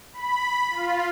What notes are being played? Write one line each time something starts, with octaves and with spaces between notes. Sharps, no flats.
B5
F4